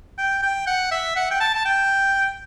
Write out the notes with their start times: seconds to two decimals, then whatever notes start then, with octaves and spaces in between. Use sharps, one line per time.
0.18 G5
0.43 G5
0.67 F#5
0.91 E5
1.16 F#5
1.31 G5
1.40 A5
1.55 A5
1.65 G5